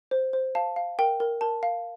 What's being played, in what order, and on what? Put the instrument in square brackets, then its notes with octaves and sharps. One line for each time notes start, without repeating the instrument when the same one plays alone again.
[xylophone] C5
C5
F5 A5
F5
A#4 G5
A#4
A#4 A5
F5